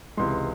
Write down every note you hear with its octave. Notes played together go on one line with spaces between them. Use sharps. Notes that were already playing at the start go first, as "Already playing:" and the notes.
C#2 C3 E3 G#3 C6